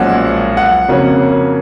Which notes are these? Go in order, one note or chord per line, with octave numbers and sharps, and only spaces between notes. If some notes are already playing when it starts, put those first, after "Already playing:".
Already playing: B1 A#2 F3 G#3 C#4 F#5
F#5
F2 C#3 F#3 A#3 C#4